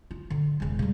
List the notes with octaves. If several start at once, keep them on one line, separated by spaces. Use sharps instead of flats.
F4
D3
E1 C#3
C#3 G3